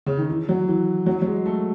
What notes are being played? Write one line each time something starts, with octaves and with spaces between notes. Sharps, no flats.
C#3
D#3
E3
F#3
E3
F#3
F#3
G#3
A3